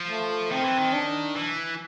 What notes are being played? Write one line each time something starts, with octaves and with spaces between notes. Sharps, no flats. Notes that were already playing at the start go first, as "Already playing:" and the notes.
Already playing: F3
A3
D#3 C4
E3
D#3
D4
E3